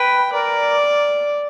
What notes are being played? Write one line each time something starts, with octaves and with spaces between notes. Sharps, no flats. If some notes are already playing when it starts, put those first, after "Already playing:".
Already playing: B4 G5
A#4 D5